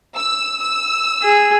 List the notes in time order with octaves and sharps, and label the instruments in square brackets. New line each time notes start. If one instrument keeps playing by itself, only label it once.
[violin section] E6
E6
[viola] G#4